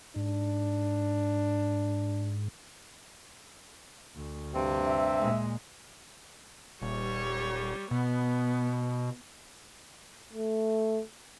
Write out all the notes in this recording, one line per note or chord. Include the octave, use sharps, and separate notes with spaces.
G#2 D4
D2
G2 C3 C4
E5
A#2 G#3
D#1 G3 C#5
B2 B3
A3